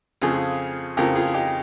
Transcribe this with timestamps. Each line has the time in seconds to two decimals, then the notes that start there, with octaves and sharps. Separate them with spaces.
0.22 F2 C#3 F3 F4 G#4
0.97 F2 C#3 F3 G4 A#4
1.16 F4 G#4
1.34 D#4 G4